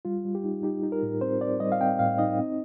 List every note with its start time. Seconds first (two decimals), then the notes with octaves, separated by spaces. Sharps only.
0.05 G3 F4
0.25 G3
0.35 G4
0.44 D#4
0.63 D#4 G4
0.83 D#4
0.92 A#4
1.03 A2
1.21 C4 C5
1.41 C4 D5
1.60 G3 D#5
1.72 F5
1.81 C4 G5
1.99 A2 F5
2.18 D#4 D#5
2.39 C4